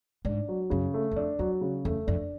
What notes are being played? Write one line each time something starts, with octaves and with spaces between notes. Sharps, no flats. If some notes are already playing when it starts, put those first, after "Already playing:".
G#2 D4
F#3
F#2 C#3
A3
F#2
F2 D4
E2 F#3
C#3
E2 A3
F2 D4